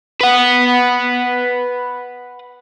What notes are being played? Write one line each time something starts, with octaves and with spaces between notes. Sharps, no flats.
B4 F#5